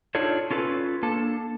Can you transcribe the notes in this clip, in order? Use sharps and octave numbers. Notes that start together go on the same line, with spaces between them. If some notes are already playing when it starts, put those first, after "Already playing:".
D4 D#4 F4 A4 C#5
C#4 F4 A4 B4
A#3 D4 A4 A5